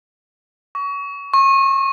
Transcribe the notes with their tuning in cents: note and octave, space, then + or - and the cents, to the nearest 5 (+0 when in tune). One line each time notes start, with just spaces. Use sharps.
C#6 +30
C#6 -35